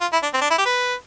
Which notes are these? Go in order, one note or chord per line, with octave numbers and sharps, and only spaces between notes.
F4
E4
D4
C4
D4
E4
G4
B4